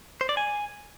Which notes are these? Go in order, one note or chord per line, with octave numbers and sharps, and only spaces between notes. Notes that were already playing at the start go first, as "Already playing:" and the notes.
C5
D5
G#5